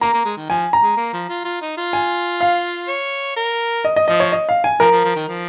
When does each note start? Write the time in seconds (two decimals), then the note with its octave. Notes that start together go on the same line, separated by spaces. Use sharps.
0.01 A#3 A#5
0.13 A#3
0.25 G#3
0.37 D#3
0.50 F3 G#5
0.73 A#5
0.82 G#3
0.97 A#3
1.13 F3
1.29 F4
1.45 F4
1.61 D#4
1.78 F4
1.93 G#5
2.41 F5
2.88 C#5
3.36 A#4
3.85 D#5
3.96 D#5
4.08 F3 D#5
4.20 C#5
4.32 D#5
4.49 F5
4.64 G#5
4.80 F3 A#4
4.92 F3
5.04 F3
5.16 D#3
5.28 F3